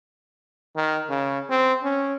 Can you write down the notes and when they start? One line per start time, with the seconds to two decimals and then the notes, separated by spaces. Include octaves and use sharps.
0.76 D#3
1.09 C#3
1.50 C4
1.83 C#4